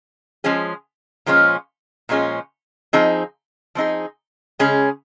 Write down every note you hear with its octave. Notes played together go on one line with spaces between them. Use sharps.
F3 G#3 C#4 G#4
A#2 F3 G#3 C#4 F4
A#2 F3 G#3 C#4 F4
F3 C4 D#4 G#4
F3 C4 D#4 G#4
C#3 G#3 C#4 G#4